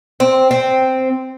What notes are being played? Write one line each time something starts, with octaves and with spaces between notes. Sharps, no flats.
C4
C4